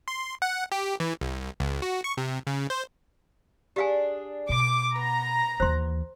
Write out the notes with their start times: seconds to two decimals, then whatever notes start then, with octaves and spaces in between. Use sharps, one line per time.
0.08 C6
0.42 F#5
0.72 G4
1.00 E3
1.21 C2
1.60 C#2
1.82 F#4
2.04 C#6
2.17 C3
2.47 C#3
2.70 C5
3.76 D4 G4 G#4 F5 G#5
4.49 B2 D6
4.96 B3 A#5
5.60 D#2 E3 C5 C6